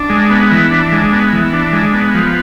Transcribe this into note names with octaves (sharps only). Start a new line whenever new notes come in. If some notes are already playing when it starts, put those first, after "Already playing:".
Already playing: D4
G#3
B3
E3
D4
G#3
B3
E3
D4
G#3
B3
F3